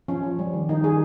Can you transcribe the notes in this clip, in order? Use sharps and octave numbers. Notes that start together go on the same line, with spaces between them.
F3 C#4
F3
G3
D#3
D#3 D#4
D#3 G#4